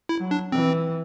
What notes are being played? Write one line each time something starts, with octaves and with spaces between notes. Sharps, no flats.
E4
F#3
D4
E3 C4